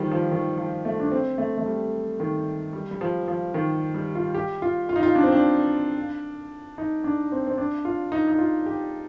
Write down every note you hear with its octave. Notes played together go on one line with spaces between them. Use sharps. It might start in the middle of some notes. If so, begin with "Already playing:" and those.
Already playing: D#3 F3 G3
F3
D#3
F3
A3
D4
C4
A3
A3
G3
D#3
G3
G3
F3
F3
D#3
G3
F4
G4
F4
F4
D#4
F4
D4
C4
D4
D#4
D4
C4
C4
D4
F4
D#4
D#4
F4
G4